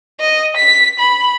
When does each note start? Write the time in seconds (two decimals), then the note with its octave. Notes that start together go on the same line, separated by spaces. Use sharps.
0.20 D#5
0.56 B6
0.99 B5